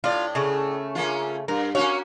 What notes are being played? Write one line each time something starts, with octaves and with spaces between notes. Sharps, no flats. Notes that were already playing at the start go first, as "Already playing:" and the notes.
A2 F4 D5
C#3 A3
A#3 C#4 F4
G2 A#4
A#3 C#4 F#4 C#5 F5